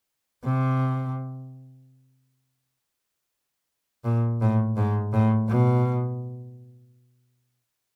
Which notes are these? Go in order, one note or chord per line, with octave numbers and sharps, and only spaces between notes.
C3
A#2
A2
G#2
A2
B2